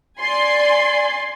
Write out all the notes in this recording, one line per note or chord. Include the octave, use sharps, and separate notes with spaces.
D5 G#5 C6